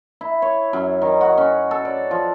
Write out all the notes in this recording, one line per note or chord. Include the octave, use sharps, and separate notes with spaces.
E4
C#5
F#2
D#3
F#4
C#4
A4
D5
F3